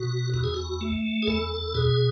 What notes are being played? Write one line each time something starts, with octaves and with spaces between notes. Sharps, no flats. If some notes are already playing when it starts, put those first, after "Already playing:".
Already playing: B2 F#4
E2 F#4
G#4
F#4
A3
G#4
E2 A4
B2 G#4